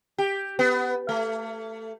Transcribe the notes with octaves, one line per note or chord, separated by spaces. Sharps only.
G4
B3
A3